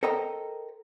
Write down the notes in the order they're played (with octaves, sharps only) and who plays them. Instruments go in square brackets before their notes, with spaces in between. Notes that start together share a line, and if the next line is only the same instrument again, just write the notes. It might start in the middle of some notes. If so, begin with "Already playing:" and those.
[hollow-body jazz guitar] A4 A#4 C5 D#5 G5 A#5